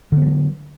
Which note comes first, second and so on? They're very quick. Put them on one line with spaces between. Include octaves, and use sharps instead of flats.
D3 B3 F3 F#3